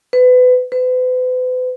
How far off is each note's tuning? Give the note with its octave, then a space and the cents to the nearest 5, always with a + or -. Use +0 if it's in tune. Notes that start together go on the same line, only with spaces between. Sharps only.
B4 +25
B4 +40